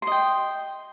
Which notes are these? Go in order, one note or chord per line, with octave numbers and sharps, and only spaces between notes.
D#5 G5 C6